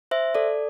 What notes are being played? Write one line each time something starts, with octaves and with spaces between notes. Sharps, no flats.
C5 E5
A4 D5